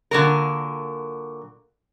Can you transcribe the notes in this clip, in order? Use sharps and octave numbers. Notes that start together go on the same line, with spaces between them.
A#2 D3 F#3 A#4